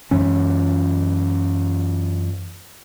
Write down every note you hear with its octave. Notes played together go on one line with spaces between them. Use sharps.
F#2 E3 C#4